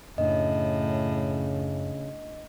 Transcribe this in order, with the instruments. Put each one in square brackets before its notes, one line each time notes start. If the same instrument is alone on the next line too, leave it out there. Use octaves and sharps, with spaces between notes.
[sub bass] F#2 [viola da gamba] A2 [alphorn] C#3 [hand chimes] D4 D#5